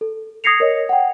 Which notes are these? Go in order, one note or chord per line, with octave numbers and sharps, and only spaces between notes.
A4
D#6 G#6 A#6 C7 C#7 F7
A#4 C#5 D#5
F#5 G5